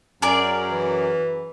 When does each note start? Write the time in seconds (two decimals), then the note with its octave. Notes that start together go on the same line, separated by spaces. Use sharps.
0.22 F#2 G#4 A#4 D5
0.71 E3